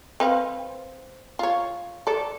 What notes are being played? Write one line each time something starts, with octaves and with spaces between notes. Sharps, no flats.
C4 B4 F5
F4 C#5
A4 D5